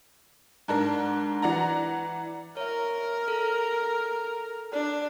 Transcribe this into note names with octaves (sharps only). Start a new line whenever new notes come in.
G#2 D4 A#4
E3 D5 F#5 A#5
A#4 C#5 E5
A4
D4